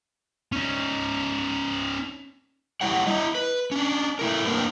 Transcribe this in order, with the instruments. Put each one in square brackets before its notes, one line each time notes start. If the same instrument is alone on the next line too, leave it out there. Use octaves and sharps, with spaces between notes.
[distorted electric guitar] C#4 D#4
[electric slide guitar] G3 E4 C#5 F#5
E4 D#5
B4
C#4 D4
A3 E4 A#4
A#3 C4 D4 D#4 A#4 B4